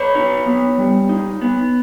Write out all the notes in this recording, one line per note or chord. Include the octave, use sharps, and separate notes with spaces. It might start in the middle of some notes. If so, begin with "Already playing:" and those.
Already playing: B4 C#5
D#4
B3
G3
D#4
B3